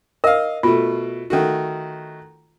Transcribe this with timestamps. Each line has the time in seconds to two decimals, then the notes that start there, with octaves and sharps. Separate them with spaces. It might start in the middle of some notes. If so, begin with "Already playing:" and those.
0.24 A#4 D#5 F5
0.63 B2 A3 F4
1.30 D#3 A3 F#4